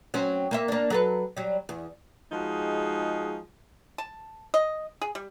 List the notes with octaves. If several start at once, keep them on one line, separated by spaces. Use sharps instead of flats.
F#3 C4 C#4
A#3 C5 E5
A#3 D4
F#3 A4 B4
F#3 G3
E2
F3 G#3 D#4 F#4 G#4
A5
D#5
G#4
G3